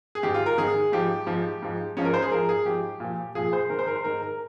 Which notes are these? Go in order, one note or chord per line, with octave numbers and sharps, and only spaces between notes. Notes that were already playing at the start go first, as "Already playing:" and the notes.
G#4
G#2 D#3 G4
F4
A#4
G#2 D#3 G#4
G#2 F3 G4
G#2 F3
G#2 F3
G#2 F3 C#4
A#4
C5
G#4
G#2 F3 A#4
G#4
G#2 F3 G4
A#2 F3
A#2 F3 G#4
C5
G#2 D#3 A#4
C5
A#4
C5
G#2 D#3 A#4
A#4